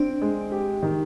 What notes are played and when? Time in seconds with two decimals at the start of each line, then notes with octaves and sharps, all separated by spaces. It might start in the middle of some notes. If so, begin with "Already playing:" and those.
Already playing: C4 D4
0.22 G#3
0.52 G4
0.83 D#3